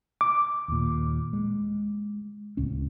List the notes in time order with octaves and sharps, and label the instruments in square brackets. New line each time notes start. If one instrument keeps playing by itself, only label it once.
[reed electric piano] D6
[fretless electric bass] D#2 A#2
G#3
D1 C#2 C#4